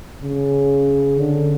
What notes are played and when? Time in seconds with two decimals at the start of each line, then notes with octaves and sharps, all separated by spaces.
0.23 C#3
1.19 D3